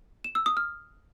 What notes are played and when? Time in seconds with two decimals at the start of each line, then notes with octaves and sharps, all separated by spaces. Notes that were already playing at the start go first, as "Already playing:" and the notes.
0.24 E7
0.35 E6
0.46 D#6
0.57 F6